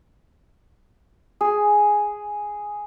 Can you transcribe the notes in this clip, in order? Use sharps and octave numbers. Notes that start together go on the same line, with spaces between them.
G#4